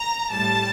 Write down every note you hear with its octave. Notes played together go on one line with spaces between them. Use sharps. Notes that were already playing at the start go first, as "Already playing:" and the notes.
Already playing: A#5
A2 G3 A5